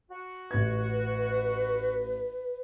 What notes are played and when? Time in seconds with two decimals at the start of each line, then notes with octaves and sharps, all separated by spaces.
0.11 F#4
0.51 A1 B4 G#6